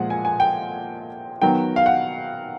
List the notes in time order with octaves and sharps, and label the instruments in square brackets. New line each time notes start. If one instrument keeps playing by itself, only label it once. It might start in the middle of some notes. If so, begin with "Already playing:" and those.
Already playing: [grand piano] A#2 F3 G#3 F#5
G#5
G#5
G5
D#3 F#3 B3 G5
F5
F#5